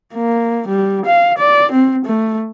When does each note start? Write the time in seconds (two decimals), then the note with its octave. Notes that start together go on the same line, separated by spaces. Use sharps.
0.14 A#3
0.68 G3
1.06 F5
1.39 D5
1.72 C4
2.05 A3